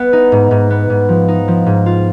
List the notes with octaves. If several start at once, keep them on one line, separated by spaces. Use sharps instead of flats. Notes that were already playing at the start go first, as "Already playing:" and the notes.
Already playing: B3
D#4
G#2
G#2
B3
G#2
F3
D#4
F3
G#2
F4